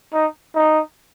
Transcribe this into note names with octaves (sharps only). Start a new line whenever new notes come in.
D#4
D#4